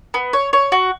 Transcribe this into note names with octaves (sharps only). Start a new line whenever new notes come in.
B3
C#5
C#5
F#4